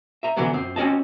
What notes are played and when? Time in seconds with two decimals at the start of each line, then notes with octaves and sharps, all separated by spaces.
0.23 E5 A#5
0.37 D3 E3 F#3 B3
0.53 F#2 C4
0.76 C4 C#4 F#4 D#5 A5